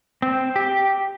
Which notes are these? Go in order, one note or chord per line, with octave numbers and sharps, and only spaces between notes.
C4
G4